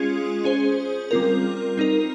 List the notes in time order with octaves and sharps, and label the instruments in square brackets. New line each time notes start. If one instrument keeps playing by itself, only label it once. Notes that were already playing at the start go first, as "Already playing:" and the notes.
Already playing: [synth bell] G#3 C#4 F4 G#4
C#4 G#4 C5
G3 C4 F4 A#4
C4 D#4 A#4